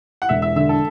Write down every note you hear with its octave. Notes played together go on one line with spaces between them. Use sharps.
F#5
E1 E5
E5
D3 E5
A4